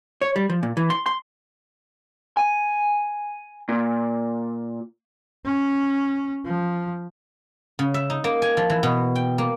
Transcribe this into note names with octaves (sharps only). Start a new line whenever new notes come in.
C#5
G3
F3
A#2
E3
C6
C6
G#5
A#2
C#4
F3
C#3
E5
D#4
A#3
G#5
F3
E3
B2
G5
A#3